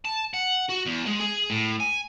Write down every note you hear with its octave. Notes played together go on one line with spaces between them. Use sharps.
A5
F#5
F#4
E2
G#3
G#4
A2
G#5